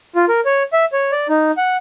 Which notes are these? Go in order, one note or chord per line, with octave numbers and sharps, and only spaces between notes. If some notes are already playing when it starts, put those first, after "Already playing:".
F4
A#4
C#5
E5
C#5
D5
D#4
F#5